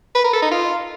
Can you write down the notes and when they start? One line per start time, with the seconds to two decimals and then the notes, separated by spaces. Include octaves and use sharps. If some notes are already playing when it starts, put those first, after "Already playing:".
0.15 B4
0.24 A#4
0.33 A4
0.42 D#4
0.51 F4